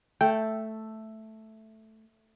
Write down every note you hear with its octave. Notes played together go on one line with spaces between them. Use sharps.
A3 G5